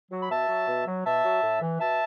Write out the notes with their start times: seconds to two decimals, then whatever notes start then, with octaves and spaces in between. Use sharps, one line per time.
0.11 F#3
0.21 B5
0.30 B2 E5 A5
0.48 F#3
0.68 B2
0.87 F#3
1.05 B2 E5 A5
1.24 F#3
1.43 A2
1.62 E3
1.80 B2 E5 A5